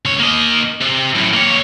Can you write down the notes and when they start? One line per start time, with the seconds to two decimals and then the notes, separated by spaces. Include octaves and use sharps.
0.05 C#2 C#5
0.20 A#3 D#5
0.81 C3
1.15 F#2 A2
1.33 A#3 C#5